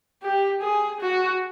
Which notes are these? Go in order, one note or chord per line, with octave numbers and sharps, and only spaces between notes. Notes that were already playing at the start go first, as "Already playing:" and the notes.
G4
G#4
F#4